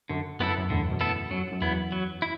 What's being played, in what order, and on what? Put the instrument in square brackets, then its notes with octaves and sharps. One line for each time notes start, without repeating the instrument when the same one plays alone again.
[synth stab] F#2 [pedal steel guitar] D3
[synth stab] F#2 [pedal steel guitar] B3 E4 A4
[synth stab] F#2
[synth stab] E2 A2 [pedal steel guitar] D3
[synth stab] F#2 B2
[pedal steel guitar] B3 E4 A4
[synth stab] F#2 [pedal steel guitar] F#3
[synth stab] F#2
[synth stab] E2 [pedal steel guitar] B3 E4
[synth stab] F#2
[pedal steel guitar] F#3
E4